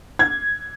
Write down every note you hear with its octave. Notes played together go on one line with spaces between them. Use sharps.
G#6